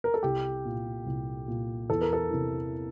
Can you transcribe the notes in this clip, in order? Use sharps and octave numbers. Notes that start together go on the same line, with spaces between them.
A#4
A4
C2 G4
A#2
C2
A#2
E2 A4
A#4
A4
C3 E3